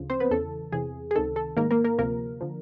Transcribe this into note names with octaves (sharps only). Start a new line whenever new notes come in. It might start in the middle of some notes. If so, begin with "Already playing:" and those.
Already playing: D2 C#3 F3
C4 C5
B3 B4
E2 C#3 E3 A4
E2 C3 E3 G#4
G#4
C#2 C3 D#3 A4
A4
G#2 D#3 A#3 A#4
A#3 A#4
A#3 A#4
D2 C3 F3 A#3 A#4
D3 F3